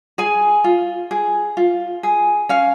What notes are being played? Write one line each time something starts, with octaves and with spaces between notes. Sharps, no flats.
G#4 G#5
F4
G#4
F4
G#4
C#4 F5